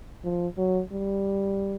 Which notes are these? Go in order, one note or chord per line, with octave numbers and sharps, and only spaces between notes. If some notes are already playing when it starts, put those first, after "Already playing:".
F3
F#3
G3